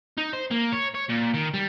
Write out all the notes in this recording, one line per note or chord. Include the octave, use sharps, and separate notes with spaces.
D#4
C5
A#3
C#5
C#5
A#2
D#3
G3